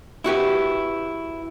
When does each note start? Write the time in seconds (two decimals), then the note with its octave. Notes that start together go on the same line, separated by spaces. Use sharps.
0.24 E4 F#4 G4 B4